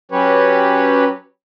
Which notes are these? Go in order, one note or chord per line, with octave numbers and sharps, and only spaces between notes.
F#3 C#4 G4 B4 C#5